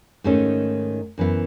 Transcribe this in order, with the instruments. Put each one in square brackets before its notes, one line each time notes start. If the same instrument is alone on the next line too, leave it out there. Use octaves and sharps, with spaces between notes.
[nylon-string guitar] G#2 D#3 A3 C#4
F#2 E3 B3 E4